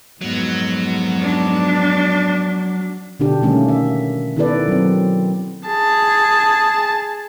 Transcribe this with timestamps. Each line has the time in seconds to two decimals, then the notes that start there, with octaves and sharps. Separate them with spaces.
0.22 F2 G#2 F#3 B3
1.21 D4
3.20 B2 D3 D4 G4
3.42 D#3 G3 A3 A#3 C#4
3.68 E5
4.36 D#3 B3 E4 A4 B4 D5
4.68 F#3 C4
5.68 G#4 A5